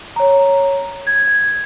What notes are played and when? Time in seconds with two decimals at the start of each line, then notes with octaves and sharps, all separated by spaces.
0.16 C#5 A#5
1.07 G#6